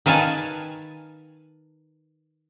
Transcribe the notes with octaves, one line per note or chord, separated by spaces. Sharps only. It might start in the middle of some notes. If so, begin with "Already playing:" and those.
D#3 B4 F5 G#5 A5